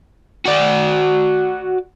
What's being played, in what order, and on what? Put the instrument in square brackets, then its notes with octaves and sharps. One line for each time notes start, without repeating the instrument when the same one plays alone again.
[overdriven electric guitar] F#4 D5